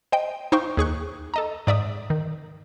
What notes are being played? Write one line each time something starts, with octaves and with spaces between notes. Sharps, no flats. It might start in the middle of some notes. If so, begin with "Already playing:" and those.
C5 D#5 G5
D#4 C5 F5 G5 C#6
D#2 G#4 C#6 F#6
A4 D#5 A#5
G#2 D5 E5 D#6
D#3